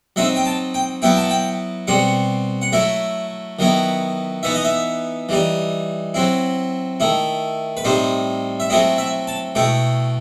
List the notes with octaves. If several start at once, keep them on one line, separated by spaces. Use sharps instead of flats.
F#3 C4 D#4 E5
G5
A5
G5
F#3 B3 E4 G5
A5
G5
B2 G3 C4 F#5
F#5
F#3 A3 E4 E5
D#3 F#3 B3 E4
E3 B3 D#4 E5
D#5
E5
E3 G3 D#4
F#3 C4 E4
D#3 A3 E4
B4
A2 G3 C4 D#4 C5
E5
F#3 A3 C4 E4 D#5
E5
A5
B2 A3 E4 G5